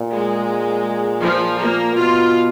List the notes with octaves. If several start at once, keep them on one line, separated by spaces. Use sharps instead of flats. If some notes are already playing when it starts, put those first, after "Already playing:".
Already playing: A#2
G#3
F3
A#3
B2 F4